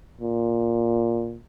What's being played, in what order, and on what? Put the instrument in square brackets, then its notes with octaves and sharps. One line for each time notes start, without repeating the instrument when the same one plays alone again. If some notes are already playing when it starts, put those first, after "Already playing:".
[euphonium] A#2